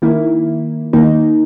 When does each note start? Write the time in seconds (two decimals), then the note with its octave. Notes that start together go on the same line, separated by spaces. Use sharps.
0.02 D#3 A#3 E4
0.93 D#3 A#3 D#4